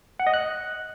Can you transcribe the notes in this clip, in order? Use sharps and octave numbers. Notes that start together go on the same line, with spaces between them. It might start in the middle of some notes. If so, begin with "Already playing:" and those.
F#5
D#5
F#6